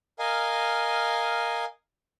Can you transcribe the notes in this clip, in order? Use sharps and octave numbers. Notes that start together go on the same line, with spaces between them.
A#4 D#5 F5 G#5